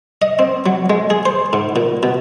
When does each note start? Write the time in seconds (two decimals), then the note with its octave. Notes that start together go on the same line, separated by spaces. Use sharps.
0.22 D#5
0.39 C4
0.66 F#3
0.90 G#3
1.10 G#4
1.26 C5
1.53 G#2
1.76 A#2
2.03 B2